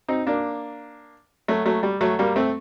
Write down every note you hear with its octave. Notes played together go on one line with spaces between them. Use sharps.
C4 D#4
A#3 D4
F#3 A3
F#3 A3
G3
F#3 A3
G3 A#3
A3 C4